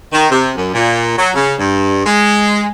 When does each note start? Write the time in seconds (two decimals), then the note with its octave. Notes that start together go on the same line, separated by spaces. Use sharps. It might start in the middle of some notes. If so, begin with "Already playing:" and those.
0.12 D#3
0.30 C3
0.55 F#2
0.74 A#2
1.17 F#3
1.35 C#3
1.58 G2
2.06 G#3